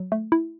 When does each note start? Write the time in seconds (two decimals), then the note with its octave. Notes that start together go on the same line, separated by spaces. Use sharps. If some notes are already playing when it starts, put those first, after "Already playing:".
Already playing: F#3
0.12 A3
0.32 E4